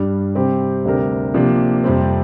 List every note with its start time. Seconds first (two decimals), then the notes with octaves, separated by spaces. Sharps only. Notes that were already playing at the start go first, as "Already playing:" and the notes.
Already playing: G2 G3 D4
0.35 C3 G3 C4 G4 C5
0.85 D2 C3 G3 D4 A#4
1.34 C3 F3 A#3 D4
1.84 F2 C3 G3 C4